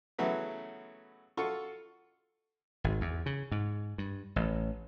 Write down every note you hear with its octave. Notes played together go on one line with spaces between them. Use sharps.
C#3 E3 F#3 A3 B3
F4 F#4 A4 C#6
G#1
E2
C#3
G#2
G2
A1